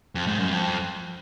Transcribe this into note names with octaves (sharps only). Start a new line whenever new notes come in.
F2
G#2
F#2
F2